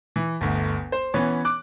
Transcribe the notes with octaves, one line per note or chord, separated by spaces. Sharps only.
E3
G1 D2
C5
E3 B3 C#4 C#5
D6 F#6